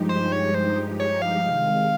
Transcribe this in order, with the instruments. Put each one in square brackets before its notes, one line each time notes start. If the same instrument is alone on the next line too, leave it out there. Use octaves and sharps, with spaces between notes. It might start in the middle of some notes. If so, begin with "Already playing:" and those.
Already playing: [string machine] G2 F3 G#3 D#4 G4
[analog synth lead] C5
C#5
C5
C#5
F5
[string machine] C3 D#3 G#3